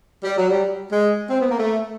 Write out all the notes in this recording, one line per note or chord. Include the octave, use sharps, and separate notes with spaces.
G3
F#3
G3
G#3
C4
B3
A#3
A3